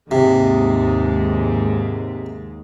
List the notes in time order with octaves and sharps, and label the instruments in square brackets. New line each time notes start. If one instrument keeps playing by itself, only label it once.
[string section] D#2 G#2 G#3 [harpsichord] C3